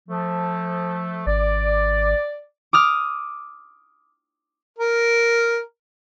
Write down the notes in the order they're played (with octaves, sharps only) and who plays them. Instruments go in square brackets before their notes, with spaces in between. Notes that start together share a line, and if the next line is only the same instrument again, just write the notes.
[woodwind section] F3 A3
[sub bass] G#1 [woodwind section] D5
[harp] D6 D#6 F6
[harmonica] A#4